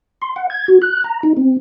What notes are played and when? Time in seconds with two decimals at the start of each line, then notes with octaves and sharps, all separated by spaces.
0.22 C6
0.36 F#5
0.50 G#6
0.68 F#4
0.82 F#6
1.04 A#5
1.23 D#4
1.37 C4